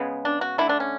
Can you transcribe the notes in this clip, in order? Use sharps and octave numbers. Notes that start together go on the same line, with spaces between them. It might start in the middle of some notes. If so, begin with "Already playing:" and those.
Already playing: C#3 G#3 B3
D4
F#4
D3 A3 E4
D4
C#4